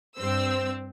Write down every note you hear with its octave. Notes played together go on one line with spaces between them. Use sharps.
G2 C4 C5 E6